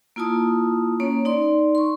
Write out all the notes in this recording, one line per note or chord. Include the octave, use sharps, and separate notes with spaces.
A#3 E4 F4 A5 D#6
A#3 C#4 C#5
D#4 D5 C6
C6 C#6